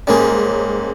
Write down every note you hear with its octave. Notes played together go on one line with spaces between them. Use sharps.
G#2 G3 A#3 C#4 G#4